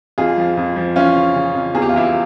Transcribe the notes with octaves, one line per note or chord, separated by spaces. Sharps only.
F2 F4 G#4
F3
F2
F3
E3 C#4 F4
C#3
C#3
F2
E2 G#4
G4
F4
E3 E4 G4